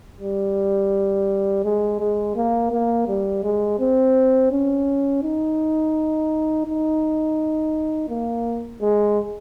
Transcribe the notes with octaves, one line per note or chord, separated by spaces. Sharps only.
G3
G#3
G#3
A#3
A#3
G3
G#3
C4
C#4
D#4
D#4
A#3
G#3